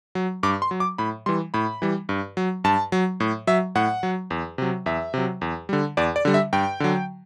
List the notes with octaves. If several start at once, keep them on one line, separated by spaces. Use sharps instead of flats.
F#3
G2 D6
C6
F#3
D6
A2 B5
E3 G3 C6
A2 B5
E3 G3
G2
F#3
G2 A5
F#3
A2
F#3 E5
A2 F#5
F#3
E2
C3 F#3
E2 E5
C3 F#3
E2
D3 G3
E2 D5
D5
D3 G3
E5
G2 G5
D3 F#3